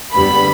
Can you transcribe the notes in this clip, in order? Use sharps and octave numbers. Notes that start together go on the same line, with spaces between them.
E2 D3 G3 B3 B5